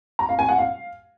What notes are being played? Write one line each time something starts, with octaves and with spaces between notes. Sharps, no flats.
A#5
F5
G#5
F#5
F5